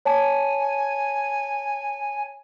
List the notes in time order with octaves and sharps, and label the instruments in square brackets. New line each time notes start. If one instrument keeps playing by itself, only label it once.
[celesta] C#5 A5 [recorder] G#5